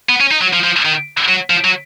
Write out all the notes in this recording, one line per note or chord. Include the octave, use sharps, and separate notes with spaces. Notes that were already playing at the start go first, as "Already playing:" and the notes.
B3
C#4
D#4
F#3
F3
F3
D#3
F#3
F3
F#3